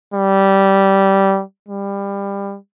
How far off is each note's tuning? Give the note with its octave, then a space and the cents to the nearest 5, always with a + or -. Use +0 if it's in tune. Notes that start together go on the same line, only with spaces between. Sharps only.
G3 -15
G3 +25